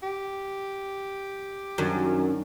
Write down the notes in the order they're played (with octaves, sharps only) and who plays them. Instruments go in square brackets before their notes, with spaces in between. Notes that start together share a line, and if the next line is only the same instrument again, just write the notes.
[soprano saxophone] G4
[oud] F#2 [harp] D#3 C#4 D4